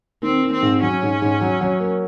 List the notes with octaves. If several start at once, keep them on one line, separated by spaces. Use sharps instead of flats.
D#3 C4
D#3
C4
G#2
F#3 C#4
G#2
G#2
F#3
F#3
A#3